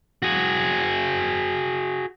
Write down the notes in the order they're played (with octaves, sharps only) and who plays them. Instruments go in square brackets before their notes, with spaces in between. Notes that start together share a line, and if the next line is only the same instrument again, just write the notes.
[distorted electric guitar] F#4 G#4